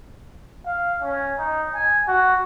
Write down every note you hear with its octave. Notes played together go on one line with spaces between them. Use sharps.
F5
C#4
D#4
G#5
F#4